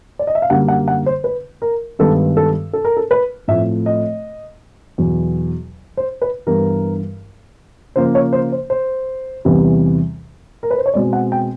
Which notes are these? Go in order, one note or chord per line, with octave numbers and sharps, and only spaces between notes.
D5
D#5
E5
F5
F#2 D3 G3 A#3 F#5
F#5
F#5
C5
B4
A#4
G2 D#3 G#3 B3 A4
A4
A4
A#4
A4
B4
A2 F3 A3 C4 E5
D#5
E2 B2 F#3
C5
B4
G2 E3 G3 B3 A#4
C#3 F3 A#3 C5
C#5
C5
C5
C5
E2 C3 E3 G3 B3
A#4
B4
C5
C#5
B2 G#3 C4 D5
F#5
G5